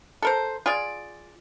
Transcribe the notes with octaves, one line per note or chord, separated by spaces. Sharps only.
A4 A#4 C5
F4 G#4 D5